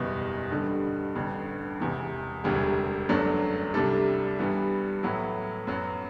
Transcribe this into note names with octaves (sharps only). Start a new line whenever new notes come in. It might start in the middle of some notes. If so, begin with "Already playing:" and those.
Already playing: F#1 E2 B2 G3
G2 D3 G3
A1 G2 D3
E1 E2 C3 E3
E1 D2 C3 G3
G1 F#2 F#3 A3 D4
C2 C3 G3 D4 A4
G2 E3 G3 B3
A2 F#3 B3 E4
F#2 F#3 B3